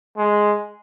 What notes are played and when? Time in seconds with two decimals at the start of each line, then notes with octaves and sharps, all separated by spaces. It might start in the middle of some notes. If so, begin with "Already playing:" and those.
0.18 G#3